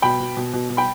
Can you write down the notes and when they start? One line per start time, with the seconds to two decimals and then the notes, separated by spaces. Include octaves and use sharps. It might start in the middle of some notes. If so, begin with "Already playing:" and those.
0.02 B2 G5 B5
0.20 B2
0.37 B2
0.53 B2
0.70 B2
0.77 G5 B5